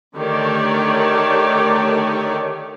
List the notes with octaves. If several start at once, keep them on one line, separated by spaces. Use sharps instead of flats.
D3 D#3 A3 G4 C#5 D5